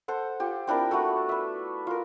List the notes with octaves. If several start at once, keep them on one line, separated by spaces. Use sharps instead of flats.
A4 C5 F#5
F4 G4
C4 D4 E4 A#4
A3 B3 F#4 A4
B4 E5
F4 A#4